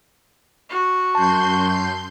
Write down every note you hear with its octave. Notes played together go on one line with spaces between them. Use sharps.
F#4
F#2 A5 C6 G6